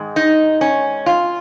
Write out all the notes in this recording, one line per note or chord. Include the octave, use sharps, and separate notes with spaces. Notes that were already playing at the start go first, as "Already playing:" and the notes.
Already playing: G#2 D#3 G#3
D#4
C#4
F4